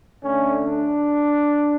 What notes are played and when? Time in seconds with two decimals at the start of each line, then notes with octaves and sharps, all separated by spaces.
0.23 D3 A3 C#4
0.65 D4